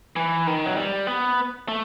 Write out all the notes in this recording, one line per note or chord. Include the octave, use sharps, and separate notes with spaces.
E3
D#3
F#3
G3
B3
A3